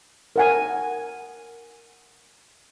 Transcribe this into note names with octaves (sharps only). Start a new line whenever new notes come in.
A#4 F#5 G#5